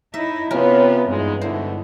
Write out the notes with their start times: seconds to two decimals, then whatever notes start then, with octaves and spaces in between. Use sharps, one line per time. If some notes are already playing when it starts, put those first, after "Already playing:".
0.14 D#4 E4 E5
0.51 C3 B3 C#4 F4 A#4
1.09 E2 G2 G#3 D#4
1.41 B2 D3 E4 C5